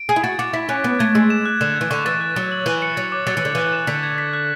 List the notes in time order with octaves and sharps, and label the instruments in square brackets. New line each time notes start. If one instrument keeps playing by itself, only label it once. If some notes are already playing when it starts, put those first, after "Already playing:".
Already playing: [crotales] D7
[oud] G#4 [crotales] G#6
[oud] E4
[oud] F#4 [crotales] A6
[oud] F#4 [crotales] D6
[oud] E4 [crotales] B6
[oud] C#4 [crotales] F#6
[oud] B3 [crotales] B6
[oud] A3 [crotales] G#6
[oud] G#3 [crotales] E6
[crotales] E7
F#6
[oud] D3 [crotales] E7
[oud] E3 [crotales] G#6
[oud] D3 [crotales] C#6
[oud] E3 [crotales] A6
[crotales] F#6
[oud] F#3 [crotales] A6
[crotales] F#7
[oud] E3 [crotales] F#6
[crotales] C#7
[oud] F#3 [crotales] A6
[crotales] D6
[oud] F#3 [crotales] A6
[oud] E3
[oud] D3 [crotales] F#7
[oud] E3 [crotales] F#6
[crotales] E7
[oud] D3 [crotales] B6
[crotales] G#6
B6
F#6